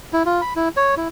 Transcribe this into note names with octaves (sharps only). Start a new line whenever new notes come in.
E4
F4
B5
E4
C#5
E4